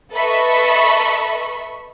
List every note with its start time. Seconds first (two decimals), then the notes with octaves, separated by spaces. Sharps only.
0.12 A4 B4 D#5 E5 B5 C#6